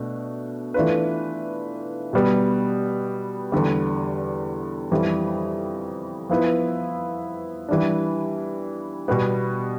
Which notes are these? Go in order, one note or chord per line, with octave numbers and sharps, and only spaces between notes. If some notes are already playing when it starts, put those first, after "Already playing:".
Already playing: B2 A3 D4
E3 A3 D4 F4 B4
B2 G3 B3
E2 D3 G3
F2 E3 G3
F3 B3 E4 B4
E3 G3 D4
B2 G3 B3